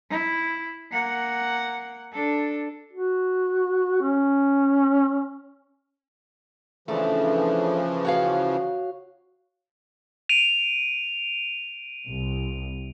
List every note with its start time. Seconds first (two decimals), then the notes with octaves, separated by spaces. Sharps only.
0.10 E4
0.92 A#3 F#5
2.13 D4 A4
2.93 F#4
4.02 C#4
6.88 C#3 E3 F3 A3 D4
8.05 F#4 C#5 F5
10.29 D7 D#7 F7
12.08 C2